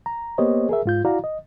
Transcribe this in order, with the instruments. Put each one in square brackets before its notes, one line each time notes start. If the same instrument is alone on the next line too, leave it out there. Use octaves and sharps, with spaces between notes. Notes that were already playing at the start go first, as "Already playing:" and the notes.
[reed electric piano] A#5
A#3 B3 G4 C5 C#5 D#5
G#4 A#4 E5
G#2 F4 G6
E4 F#4 D5 F5 A#5
D#5